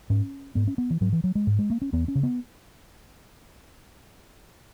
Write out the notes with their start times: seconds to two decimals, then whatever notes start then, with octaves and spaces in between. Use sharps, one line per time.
0.10 G#2 C#4
0.55 G#2 B3
0.67 C#4
0.78 B3
0.90 E3
1.01 G#2 F#3
1.12 E3
1.24 F#3
1.35 G#3
1.47 G#2
1.59 G#3
1.70 A#3
1.82 C#4
1.93 E2 B3
2.08 C#4
2.15 C#3
2.23 B3